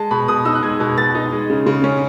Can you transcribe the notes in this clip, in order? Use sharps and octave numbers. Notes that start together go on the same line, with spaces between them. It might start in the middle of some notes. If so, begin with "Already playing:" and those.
Already playing: G#3 A5
B2 B5
B2 D#6
D#4 E6
F#6
G#3 G#6
B2
B2 A6
D#4
G#3
C#3
C#3
C#4